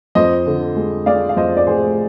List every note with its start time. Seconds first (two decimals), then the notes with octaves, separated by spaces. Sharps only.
0.15 F2 C5 D#5
0.46 D3
0.76 G#3
1.06 G#3 D5 F5
1.29 F5
1.36 F2 C5 D#5
1.57 D5
1.67 F1 G#4 C5